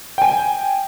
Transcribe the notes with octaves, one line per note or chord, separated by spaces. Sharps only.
G5 G#5